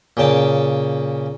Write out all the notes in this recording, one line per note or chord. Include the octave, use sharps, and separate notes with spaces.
A#2 C#3 G5 A5